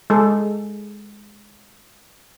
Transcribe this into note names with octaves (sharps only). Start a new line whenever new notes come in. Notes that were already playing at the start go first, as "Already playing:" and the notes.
G#3 G#4 A4